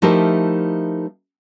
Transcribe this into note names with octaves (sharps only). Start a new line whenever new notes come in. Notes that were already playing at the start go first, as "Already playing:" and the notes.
F3 A3 D#4 E4 G4 A#4